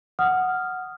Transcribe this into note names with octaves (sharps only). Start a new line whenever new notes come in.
F#5 D#6 F6